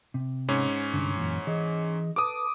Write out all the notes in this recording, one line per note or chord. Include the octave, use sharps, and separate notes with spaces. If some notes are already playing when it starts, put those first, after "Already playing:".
C3
G#2 C#4
C2 G2 D3
F#2 A#2 E3
E3 G#4 D#5
A4 B4 A5 D6 D#6